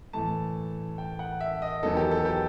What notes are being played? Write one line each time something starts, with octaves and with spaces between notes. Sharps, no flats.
A2 E3 A3 A5
G5
F#5
E5
D#5
E2 D#3 F#3 B3 D#4 A4
G4
A4
G4